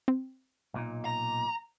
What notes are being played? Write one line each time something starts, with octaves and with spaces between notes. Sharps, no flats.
C4
B1 A#2 D#4
A#5